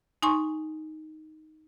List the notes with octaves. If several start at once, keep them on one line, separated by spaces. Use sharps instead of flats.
D#4 G#5 C6 C#6